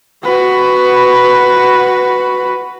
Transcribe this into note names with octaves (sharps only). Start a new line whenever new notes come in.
F#4 B4